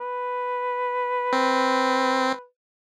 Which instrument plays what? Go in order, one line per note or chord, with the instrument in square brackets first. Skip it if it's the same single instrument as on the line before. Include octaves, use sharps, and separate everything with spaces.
[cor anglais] B4
[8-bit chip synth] C4